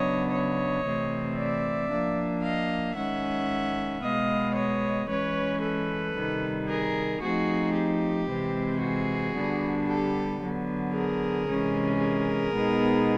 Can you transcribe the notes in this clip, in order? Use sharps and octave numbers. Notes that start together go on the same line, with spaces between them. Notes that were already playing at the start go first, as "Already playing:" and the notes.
Already playing: C#3 F#3 B3 D4 C#5 D#5
C#5 D#5
C3 E3 A3 C4
D5 E5
F3 A#3 D4
D#5 F5
D#3 G#3 C#4 E5 F#5
B2 G#3 B3 D#5 F5
C#5 D#5
E3 G#3 C#4 B4 C#5
A4 B4
C3 D#3 G3
G#4 A#4
F3 A3 C4 D#4 F#4 G#4
G4
C3 E3 G#3 C4
F#4 G#4
D3 G3 B3 D4
G4 A4
D3 F#3 B3
G#4 A#4
C3 E3 G#3 C#4
G#4 A#4
B2 G#3 B3 D#4